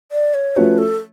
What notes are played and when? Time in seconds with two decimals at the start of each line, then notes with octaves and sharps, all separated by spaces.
0.12 D5
0.34 C#5
0.56 F3 A3 C#4 F#4 B4 C#5
0.78 A4